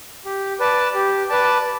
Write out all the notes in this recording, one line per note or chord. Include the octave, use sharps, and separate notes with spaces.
G4
B4 D5 A5
G4
B4 D5 A5